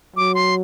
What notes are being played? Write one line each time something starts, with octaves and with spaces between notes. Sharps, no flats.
F#3 D6
C6